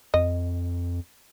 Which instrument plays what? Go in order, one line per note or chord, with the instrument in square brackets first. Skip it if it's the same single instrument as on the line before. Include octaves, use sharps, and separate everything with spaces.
[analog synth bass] F2 [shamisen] D#5